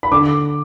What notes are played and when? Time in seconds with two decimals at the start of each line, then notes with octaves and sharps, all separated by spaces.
0.03 B5
0.12 D3 D6